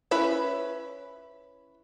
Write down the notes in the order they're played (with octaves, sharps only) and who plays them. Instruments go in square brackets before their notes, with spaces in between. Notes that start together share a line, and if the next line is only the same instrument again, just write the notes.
[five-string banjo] C#4 E4 B4 B5